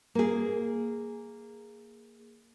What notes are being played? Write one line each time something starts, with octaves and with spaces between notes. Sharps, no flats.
A#3 G#4